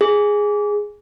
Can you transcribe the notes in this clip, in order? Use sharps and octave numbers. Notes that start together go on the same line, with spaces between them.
G#4